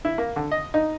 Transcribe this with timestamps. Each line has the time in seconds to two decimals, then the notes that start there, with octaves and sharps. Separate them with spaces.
0.05 E4
0.18 A#3
0.36 D3
0.52 D#5
0.74 D#4